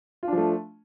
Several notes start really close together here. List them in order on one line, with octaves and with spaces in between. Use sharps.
F4 D4 F3 A3